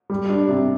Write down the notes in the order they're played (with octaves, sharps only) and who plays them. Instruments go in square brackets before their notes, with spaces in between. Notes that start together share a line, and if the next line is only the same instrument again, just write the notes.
[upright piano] G3
D4
C3